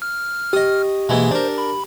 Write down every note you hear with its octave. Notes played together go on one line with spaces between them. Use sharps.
F6
G4 D#5 D#6
G#2 B2 E3 G#3 A#3
D4 A#4 C5
B5